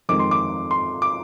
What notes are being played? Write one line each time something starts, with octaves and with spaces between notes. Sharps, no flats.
F2 D#3 G#3 C4 D6
C6
D6
C6
D6